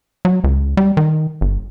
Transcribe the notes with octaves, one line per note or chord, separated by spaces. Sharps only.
F#3
C#2
G3
D#3
G1